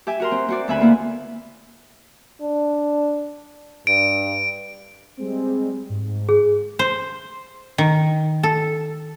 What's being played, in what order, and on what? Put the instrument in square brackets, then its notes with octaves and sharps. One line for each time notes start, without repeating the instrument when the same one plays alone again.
[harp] G4 E5 G#5
F#4 A#4 C6
C4
C4 F#4 D5
D2 B3 E5 G#5 B5
A#3 B3 E4
[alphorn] D4
[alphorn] G2 [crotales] D7
[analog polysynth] G3 G#3 C4
G#2
[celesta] G#4
[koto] C5
D#3
A4